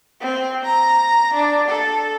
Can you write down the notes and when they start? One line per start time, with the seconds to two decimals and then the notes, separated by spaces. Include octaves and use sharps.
0.21 C4
0.65 A#5
1.34 D4
1.68 A4